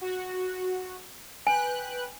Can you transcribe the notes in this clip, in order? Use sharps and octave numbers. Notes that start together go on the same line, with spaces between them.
F#4
B4 G5 G#5 F#6